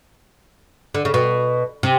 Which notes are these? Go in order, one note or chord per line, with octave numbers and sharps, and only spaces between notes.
D3
C#3
B2
C3